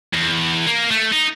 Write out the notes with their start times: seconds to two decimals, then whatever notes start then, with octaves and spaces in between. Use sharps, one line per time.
0.14 E2
0.66 A#3
0.91 A3
1.12 D#4